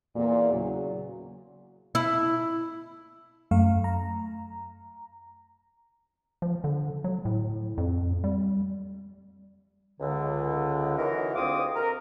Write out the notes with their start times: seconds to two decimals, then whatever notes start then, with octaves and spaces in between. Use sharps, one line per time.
0.16 E2 A#2
0.53 C#3 F#3
1.95 E4
3.51 F#2 A3 F5
3.84 A#5
6.42 F3
6.64 D3
7.04 F#3
7.25 A2
7.78 F2
8.24 G3
10.00 C#2 D3
10.98 E3 F#3 D#4 F#4 A#4
11.35 D2 C4 F4 G#4 D6 D#6
11.76 A#4